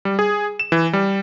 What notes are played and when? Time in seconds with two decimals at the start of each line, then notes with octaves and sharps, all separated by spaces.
0.05 G3
0.19 G#4
0.60 E7
0.72 E3
0.93 G3